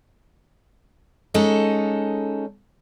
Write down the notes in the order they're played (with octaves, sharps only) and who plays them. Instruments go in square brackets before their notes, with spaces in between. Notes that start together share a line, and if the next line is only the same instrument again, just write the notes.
[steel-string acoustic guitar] G#3 C#4 D#4 A4